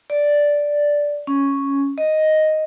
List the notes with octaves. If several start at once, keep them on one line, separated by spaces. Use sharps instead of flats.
D5
C#4
D#5